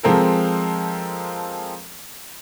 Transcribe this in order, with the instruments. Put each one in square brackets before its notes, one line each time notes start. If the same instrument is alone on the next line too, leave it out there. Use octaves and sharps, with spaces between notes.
[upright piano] F3 G#3 C4 A4 A#4